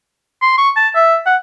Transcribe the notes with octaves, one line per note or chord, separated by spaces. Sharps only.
C6
C#6
A5
E5
F#5